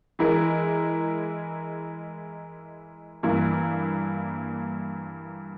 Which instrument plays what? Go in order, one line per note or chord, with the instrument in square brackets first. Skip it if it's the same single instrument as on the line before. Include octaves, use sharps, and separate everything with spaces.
[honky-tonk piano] E3 G#3 E4 A#4
G2 E3 A#3 E4